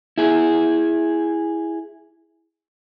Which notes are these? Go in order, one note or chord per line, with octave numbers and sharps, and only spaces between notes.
E4 G#4